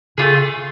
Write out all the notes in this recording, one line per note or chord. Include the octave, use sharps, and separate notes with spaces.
C#3 A3 C4 F4 G#4